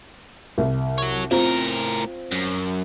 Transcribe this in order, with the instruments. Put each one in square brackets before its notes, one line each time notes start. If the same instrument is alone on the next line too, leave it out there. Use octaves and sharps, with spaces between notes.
[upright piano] C2
[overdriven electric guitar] F#4 C#5
[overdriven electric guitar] A2 A#4 [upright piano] C4 F4
[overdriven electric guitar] F#2